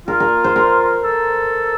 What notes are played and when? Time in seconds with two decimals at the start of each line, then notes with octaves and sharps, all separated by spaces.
0.08 F4 A#4
0.20 A#4
0.44 C5
0.56 A#4
1.04 A4